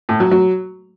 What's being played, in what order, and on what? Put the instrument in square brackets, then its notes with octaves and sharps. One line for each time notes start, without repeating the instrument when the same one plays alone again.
[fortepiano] A2
F#3
F#3